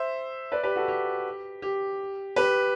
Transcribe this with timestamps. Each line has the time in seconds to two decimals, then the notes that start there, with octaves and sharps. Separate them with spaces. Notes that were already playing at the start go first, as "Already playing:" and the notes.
Already playing: C5 E5
0.52 B4 D5
0.63 G4 B4
0.76 F#4 A4
0.88 G4
1.62 G4
2.36 G4 B4